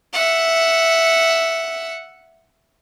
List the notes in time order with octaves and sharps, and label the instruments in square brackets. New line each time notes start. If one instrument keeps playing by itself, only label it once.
[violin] E5 F#5